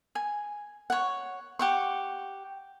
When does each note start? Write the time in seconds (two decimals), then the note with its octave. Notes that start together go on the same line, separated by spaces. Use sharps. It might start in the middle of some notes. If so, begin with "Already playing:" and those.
0.15 G#5
0.90 C#5 F#5
1.59 G4 F#5 C#6